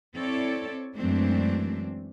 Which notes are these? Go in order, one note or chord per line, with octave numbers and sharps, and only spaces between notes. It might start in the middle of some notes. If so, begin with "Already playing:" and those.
C4 E4 A4 C#5 D5
F#2 E3 G#3 A3 C4 D4